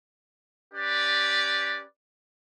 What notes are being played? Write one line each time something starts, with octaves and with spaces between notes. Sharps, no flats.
C#4 G4 B4 D5